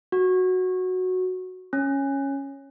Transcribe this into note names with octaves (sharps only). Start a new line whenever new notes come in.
F#4
C#4